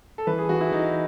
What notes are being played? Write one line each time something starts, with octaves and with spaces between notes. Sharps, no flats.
A4
E3 B4
G#4
E3 F#4
E4
E3 D#4